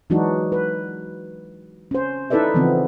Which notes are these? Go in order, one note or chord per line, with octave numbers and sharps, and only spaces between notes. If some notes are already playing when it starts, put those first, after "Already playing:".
E3 F#3 G#3 D4 D#4 F#4
B4
C#4 C5
D#4 E4 A4 B4 D5 E5
C#3 E3 F3 B3 C4